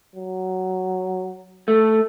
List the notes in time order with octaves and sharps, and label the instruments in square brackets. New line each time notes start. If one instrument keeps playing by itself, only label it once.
[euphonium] F#3
[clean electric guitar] A3